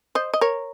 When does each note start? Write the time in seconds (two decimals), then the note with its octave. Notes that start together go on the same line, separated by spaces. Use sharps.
0.15 C5 D#5
0.33 D#5
0.41 A#4 C#5